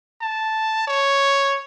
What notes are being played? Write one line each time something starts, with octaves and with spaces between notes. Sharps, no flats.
A5
C#5